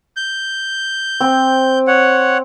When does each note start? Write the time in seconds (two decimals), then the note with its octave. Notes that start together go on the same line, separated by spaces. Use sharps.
0.17 G6
1.21 C4
1.87 C#5 F#5